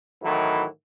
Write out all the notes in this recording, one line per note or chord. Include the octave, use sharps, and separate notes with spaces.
A2 D#3 E3 F#3